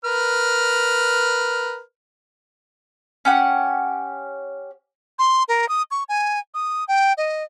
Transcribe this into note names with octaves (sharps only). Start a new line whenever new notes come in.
A#4 B4 F6
C#4 G4 F#5
C6
A#4
D#6
C#6
G#5
D#6
G5
D#5